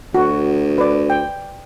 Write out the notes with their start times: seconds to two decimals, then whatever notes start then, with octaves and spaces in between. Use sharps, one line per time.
0.15 D2 F#4
0.78 B4 D5
1.10 G5